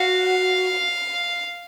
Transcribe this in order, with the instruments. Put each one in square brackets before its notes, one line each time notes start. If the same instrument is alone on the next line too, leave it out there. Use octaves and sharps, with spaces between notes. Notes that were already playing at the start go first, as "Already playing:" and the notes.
Already playing: [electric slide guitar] F#4 [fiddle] F5